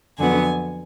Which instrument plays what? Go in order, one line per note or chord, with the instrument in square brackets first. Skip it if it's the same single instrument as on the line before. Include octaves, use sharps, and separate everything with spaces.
[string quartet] F2 D3 F#3 B3 G#5